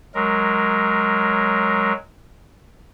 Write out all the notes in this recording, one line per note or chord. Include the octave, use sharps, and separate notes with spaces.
F#3 G#3 A#4